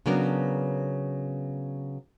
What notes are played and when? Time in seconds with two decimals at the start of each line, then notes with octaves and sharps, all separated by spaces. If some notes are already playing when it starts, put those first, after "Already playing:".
0.06 C#3 F#3 B3 D4 A#4